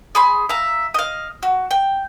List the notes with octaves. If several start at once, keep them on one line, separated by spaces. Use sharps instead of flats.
G#4 B5 C6
E5 F5 A#5
D#5 F5
F#4
G5